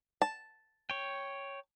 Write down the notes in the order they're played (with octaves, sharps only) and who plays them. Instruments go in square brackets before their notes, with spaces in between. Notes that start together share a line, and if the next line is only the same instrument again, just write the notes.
[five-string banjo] A5
[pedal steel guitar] C#5 G5